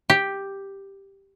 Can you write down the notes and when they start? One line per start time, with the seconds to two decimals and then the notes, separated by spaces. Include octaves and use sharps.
0.10 G4